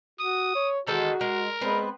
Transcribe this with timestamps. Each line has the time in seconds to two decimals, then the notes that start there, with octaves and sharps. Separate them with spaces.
0.20 F#4 D#6
0.55 C#5
0.87 D#3 E3 G#3 F#4 A4
1.21 G#3 A#4
1.61 G#3 B3 C4 B4